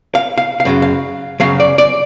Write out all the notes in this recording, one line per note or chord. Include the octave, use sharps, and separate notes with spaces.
F5
F5
F5
F#2 C#3 F#3
F5
F#2 C#3 F#3 F5
D5
D5